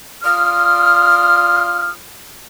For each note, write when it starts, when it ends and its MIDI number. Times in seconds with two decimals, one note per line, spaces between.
0.24 1.91 65
0.24 1.91 74
0.24 1.91 84
0.24 1.91 87
0.24 1.91 89